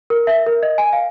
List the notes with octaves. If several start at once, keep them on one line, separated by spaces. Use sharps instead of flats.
A#4
E5
A#4
D#5
G#5
F5